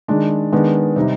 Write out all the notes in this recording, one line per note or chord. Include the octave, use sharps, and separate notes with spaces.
D#3 G#3 D4
D#3 G#3 B3 D4
C3 G3 C4 D#4